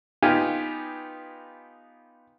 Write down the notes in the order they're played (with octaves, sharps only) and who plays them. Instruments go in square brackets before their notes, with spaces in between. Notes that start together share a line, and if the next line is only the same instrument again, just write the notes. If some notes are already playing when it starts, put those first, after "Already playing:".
[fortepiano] B3 D#4 F4 G4 G#5